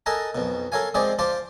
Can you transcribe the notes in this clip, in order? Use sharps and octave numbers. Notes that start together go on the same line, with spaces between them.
A4 A#4 D#5 F#5 G#5 A5
B1 F2 B2
A4 A#4 C#5 F5 G#5
F3 G#3 C4 G#4 C5 D5
F3 F4 C5 A5 D6